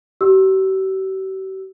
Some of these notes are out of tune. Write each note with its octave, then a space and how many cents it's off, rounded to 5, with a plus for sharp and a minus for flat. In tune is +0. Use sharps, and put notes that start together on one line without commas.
G4 -45 E6 +0